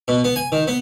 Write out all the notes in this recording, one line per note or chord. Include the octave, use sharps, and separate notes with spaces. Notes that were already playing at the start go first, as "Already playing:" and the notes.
B2
B3
G#5
D#3
B3